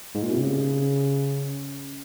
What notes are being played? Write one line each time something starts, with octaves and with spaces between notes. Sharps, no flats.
G#2
A#2
C3
C#3